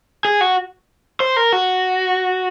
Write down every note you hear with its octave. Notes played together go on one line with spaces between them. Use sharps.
G#4
F#4
C5
A#4
F#4